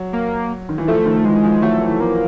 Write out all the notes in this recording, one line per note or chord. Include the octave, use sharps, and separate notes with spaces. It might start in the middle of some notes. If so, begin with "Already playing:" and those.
Already playing: F#3
A#3
D#3
E3
F3 A3
D#3
E3 G#3
F3
F#3 A3
E3
F3 A#3